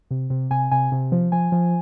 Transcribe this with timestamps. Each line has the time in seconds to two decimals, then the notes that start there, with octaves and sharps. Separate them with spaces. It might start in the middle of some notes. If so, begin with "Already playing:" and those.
0.11 C3
0.30 C3
0.51 C3 G#5
0.71 C3 G#5
0.92 C3
1.12 F3
1.32 F3 G#5
1.52 F3